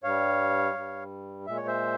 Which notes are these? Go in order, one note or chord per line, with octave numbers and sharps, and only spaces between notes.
G2 G3 C#5 F5
G2 G3
A#2 G#3 E5
C#5
C5 E5